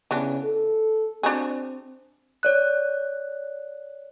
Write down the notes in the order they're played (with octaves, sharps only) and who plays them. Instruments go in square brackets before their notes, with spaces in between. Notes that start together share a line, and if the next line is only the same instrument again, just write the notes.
[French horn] C#3 [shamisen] E3 B3 D4
[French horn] A4
[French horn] C4 [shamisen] D4 F#4 G#4
[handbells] C#5 D5 F#6